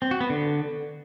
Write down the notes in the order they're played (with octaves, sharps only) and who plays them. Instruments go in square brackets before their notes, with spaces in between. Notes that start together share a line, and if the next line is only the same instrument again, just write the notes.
[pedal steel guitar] C4
F#4
B3
D3